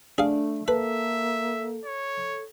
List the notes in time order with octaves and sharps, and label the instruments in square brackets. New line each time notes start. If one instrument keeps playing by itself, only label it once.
[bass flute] A3 [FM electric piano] D4 [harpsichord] G#4 F5
[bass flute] A#3 [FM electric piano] A4 [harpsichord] B4 [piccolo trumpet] E5
[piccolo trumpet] C#5